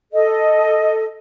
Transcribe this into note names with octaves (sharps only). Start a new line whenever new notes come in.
A4 D#5